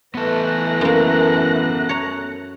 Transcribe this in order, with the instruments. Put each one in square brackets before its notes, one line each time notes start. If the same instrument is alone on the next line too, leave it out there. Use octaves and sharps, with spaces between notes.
[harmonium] E3 [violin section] A3 F#6 A#6 [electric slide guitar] B3 A4
[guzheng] F#2 A#3
C#5 A#5